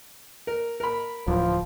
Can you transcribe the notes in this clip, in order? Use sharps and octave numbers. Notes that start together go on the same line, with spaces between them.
A#4
A#4 B5
D1 F3